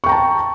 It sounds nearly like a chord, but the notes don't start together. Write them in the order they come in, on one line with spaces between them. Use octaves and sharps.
C#6 G5 A#5 A5